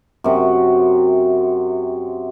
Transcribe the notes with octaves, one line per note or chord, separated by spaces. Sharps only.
F#2 C3